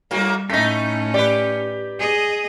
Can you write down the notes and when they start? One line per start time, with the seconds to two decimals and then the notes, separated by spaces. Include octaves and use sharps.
0.11 G#2 G3 A#3 F#4
0.50 A2 A3 C#4 D#4 A#6 B6
1.14 G4 B4 D5
1.99 G#4 D#5